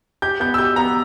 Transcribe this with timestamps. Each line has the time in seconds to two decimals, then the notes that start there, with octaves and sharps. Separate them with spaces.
0.22 G4 G6
0.40 B3 G6
0.54 E6
0.58 G4 G6
0.76 B3 A#5